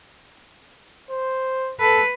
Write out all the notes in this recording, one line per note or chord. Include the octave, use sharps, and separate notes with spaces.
C5
A4 B4